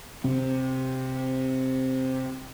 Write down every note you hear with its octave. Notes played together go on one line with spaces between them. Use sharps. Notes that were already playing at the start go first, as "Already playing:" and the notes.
C3 C4